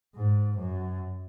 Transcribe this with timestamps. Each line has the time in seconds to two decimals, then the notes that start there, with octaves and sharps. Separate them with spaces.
0.15 G#2
0.57 F#2